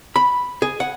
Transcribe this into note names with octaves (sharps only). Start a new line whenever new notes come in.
B5
G#4
F#5